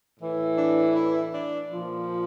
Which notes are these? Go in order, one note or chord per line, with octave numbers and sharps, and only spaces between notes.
A2 E3
D4
E4
D4
A#2 F3